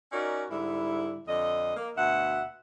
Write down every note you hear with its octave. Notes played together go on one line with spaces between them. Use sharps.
C#4 D#4 F#4 A#4 D5
G#2 D3 G3 E4
F2 D3 D#5
A#3
D2 B2 E5 F#5